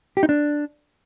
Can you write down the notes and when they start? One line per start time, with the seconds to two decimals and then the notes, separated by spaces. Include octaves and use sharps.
0.17 G4
0.23 D#4
0.29 D4